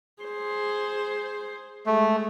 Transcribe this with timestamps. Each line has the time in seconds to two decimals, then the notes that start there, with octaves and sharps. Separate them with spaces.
0.23 G#4 C5
1.86 G#3 A3